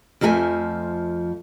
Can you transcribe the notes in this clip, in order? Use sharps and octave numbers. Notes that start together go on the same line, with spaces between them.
F2 F3 A3 G#4 E5 G#5